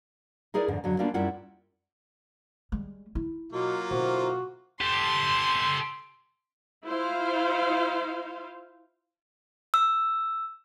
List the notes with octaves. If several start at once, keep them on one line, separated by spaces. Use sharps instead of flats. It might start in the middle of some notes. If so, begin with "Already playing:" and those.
D#4 E4 G#4 A#4 B4 D5
F2 G#2 D3
F2 D3 F#3
G3 A#3 B3 C#4 D4 F4
F#2 G3 E4 F4 F#5
G3 G#3
D#4 E4
B2 F#3 A#3 F4
B2 D3 E4 F#4 C5
G4 A4 C6
E4 F4 C5 F5
E6